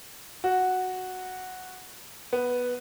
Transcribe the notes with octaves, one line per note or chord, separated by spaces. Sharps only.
F#4
B3